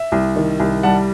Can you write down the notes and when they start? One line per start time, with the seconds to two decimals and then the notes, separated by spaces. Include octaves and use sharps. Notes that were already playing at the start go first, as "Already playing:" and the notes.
Already playing: E5
0.12 C2
0.36 D#3
0.60 C2
0.83 G3 F#5 A5